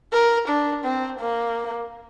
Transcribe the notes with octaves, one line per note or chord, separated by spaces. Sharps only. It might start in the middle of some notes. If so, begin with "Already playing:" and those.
A#4
D4
C4
A#3